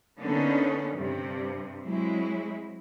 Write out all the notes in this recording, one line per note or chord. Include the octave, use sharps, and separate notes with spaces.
D3 A#3 B3 C#4 D#4
G2 C3
F#3 G#3 C4 E4